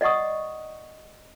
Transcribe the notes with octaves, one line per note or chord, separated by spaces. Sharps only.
D5 D#5 F#5 C#6 D#6